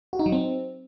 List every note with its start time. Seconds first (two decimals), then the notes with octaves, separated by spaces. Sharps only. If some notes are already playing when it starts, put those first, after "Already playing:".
0.13 F#4
0.19 D#4
0.26 F#3
0.32 C4